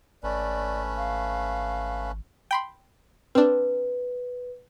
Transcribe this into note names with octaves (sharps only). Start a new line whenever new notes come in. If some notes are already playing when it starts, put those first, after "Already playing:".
G#1 A3 C#4 B4 D5
F5
G5 B5 C6
C4 D4 B4